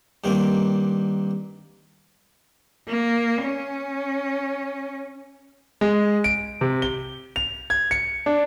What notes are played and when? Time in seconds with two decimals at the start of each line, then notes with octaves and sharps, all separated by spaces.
0.24 G2 D#3 A#3 C4
2.88 A#3
3.42 C#4
5.81 G#3
6.24 D7
6.61 C3
6.82 G7
7.36 F7
7.70 G#6
7.91 C#7
8.26 D4